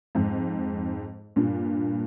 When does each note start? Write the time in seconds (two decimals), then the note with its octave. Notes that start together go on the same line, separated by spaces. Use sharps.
0.15 F2 G#2
1.36 G2 A#2